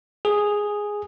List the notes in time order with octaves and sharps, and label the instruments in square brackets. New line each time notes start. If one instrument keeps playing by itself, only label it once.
[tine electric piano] G#4